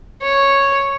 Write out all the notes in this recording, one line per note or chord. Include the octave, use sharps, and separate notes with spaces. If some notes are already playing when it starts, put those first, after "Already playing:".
C#5